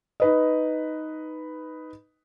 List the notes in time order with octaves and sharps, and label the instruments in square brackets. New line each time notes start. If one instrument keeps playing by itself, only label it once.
[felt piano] D#4 B4 D#5